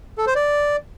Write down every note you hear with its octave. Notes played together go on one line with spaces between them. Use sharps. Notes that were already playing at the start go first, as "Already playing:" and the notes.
A4
C5
D5